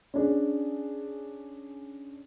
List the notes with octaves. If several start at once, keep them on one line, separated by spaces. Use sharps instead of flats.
C#4 D4 G#4